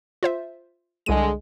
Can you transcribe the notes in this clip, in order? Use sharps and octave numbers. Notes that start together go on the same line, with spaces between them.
F4 C5 E5
C2 D3 G#3 D#7